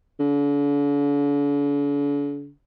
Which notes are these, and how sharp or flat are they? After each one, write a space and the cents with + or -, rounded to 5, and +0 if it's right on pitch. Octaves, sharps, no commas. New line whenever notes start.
D3 -45